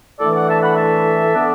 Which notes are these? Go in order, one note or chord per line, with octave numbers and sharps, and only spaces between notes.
A2 E3 A3 D4 A4 D5
D5 F#5
E5 A5
F#5 B5
E5 A5
D3 B3 D4